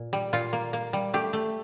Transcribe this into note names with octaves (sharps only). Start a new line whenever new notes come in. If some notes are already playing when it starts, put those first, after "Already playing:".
Already playing: A#2
G3
A#2 F4
A#3
A#3
G3
A3 G4
A3